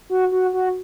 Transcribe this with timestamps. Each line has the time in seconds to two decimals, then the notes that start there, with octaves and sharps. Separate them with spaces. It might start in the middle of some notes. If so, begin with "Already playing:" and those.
0.10 F#4
0.32 F#4
0.54 F#4